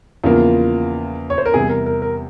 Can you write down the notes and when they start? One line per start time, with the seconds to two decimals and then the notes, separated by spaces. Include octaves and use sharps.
0.24 E2 C#3 F3 A#3 F4
1.30 C#5
1.38 C5
1.45 A#4
1.54 E2 C3 G3 G#4
1.69 A#4
1.86 A#4
2.02 A#4